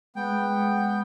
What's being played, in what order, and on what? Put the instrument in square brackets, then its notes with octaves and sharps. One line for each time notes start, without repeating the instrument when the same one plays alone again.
[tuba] G#3 [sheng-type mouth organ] B3 G5